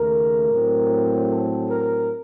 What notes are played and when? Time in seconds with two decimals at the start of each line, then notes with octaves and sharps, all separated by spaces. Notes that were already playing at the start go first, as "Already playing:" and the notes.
Already playing: D#2 C#3 A3 A#4
0.51 A2 F#3 C4
1.31 A4
1.71 A#4